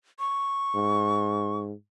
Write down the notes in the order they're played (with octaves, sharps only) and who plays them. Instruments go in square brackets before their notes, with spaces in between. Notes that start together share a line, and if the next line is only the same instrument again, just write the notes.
[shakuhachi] C#6
[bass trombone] G#2